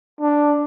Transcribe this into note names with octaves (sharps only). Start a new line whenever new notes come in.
D4